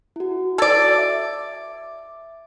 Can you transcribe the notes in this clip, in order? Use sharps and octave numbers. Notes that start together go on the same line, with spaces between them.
E4 F#4
A4 D5 G#6 A6
E5 D6